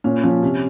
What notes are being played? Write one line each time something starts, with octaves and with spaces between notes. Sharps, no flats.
A#2 C#4
F3 C#4
C3